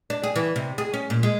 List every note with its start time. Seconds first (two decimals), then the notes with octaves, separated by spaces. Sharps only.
0.10 D4
0.23 G#4
0.36 E3
0.56 C3
0.78 G#4
0.94 C#4
1.10 A#2
1.23 G#3